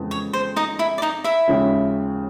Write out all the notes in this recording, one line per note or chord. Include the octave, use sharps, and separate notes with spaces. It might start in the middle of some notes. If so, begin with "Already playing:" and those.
Already playing: F2 C#3 E3 G#3 B3
C#5
C5
D#4 D#5
E4 E5
D5
D#4 D#5
E4 E5
D#2 C#3 F3 G#3 C#4